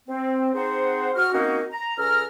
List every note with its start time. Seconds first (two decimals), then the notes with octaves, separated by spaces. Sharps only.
0.08 C4
0.54 C4 D#4 G#4 C5 F#5
1.15 F#4 F6
1.33 A#3 C4 C#4 D#4 F#4
1.72 A#5
1.98 C#2 C#4 A4 A#5 F6